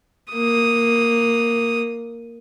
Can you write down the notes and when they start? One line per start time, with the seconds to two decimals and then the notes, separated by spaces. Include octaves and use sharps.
0.34 A#3 D#6